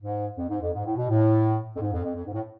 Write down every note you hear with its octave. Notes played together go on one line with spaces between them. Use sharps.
G#2
F2
G#2
F2
G#2
A2
B2
A2
F2
G#2
F2
F2
F2
G#2
A2